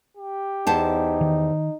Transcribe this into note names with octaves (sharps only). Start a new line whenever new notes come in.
G4
E2 D#4 C5 A5
D#3